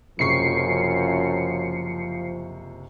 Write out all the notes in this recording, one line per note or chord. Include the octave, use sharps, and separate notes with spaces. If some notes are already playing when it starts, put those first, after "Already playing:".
F#1 F#2 C3 F3 C#6 C7 C#7